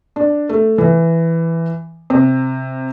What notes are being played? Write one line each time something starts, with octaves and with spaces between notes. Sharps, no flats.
D4
A3
E3
C3